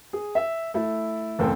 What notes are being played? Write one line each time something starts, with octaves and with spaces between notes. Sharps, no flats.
G#4
E5
A3 E4
F#1 E2 A2 C4 A4